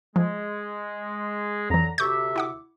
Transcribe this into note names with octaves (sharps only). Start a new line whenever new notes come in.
F3 G#3
F2 D3 E3 F#3 A#5
D2 C3 E5 C#6 G6
E4 F#5 D6